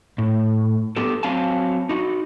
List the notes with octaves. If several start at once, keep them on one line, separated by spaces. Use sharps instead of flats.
A2
B3 G4 A4
F#3 C4 F5 G#5 A5
D#4 F#4